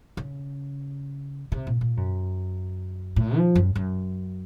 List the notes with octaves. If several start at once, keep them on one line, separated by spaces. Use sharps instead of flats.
C#3
C3
A#2
A#2
F#2
A2
F3
F#2
F#2